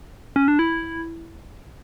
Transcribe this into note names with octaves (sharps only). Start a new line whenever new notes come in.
C#4
D4
E4